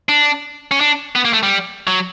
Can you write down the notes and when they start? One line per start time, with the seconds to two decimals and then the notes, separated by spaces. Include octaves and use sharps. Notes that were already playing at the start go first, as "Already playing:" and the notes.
0.09 D4
0.71 C#4
0.80 D4
1.15 B3
1.25 A#3
1.33 A3
1.43 G3
1.87 F#3